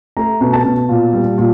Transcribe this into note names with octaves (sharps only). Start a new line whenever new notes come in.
A3 A#5
B2
A5
B2
A#2
G3
A#2